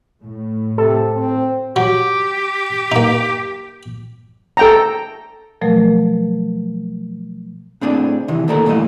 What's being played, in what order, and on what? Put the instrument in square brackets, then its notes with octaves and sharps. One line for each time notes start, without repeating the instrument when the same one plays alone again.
[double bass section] A2
[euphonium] C3 [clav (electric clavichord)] A4
[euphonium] C4
[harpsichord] F#3 [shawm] G4
[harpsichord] A#3 D#4
[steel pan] A4 G5 A#5
[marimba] B2 F3 F#3 A3 A#4
[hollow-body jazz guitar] A2 C4 D4 G#4
C3 D#3 E3
D2 A#2 D#3 A4 A#4 A#5
D2 G2 A#2 E3 A3 D#5